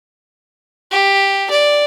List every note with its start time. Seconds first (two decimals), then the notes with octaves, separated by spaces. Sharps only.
0.91 G4
1.51 D5